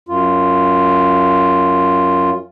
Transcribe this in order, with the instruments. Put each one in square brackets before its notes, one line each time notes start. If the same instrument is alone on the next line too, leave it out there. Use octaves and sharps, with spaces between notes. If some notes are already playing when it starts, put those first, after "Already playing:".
[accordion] F#2 F4